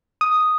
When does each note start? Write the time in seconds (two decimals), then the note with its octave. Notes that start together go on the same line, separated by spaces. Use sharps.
0.21 D#6